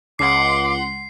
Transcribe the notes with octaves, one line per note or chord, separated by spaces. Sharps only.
C#2 F#5 C6 D6 C7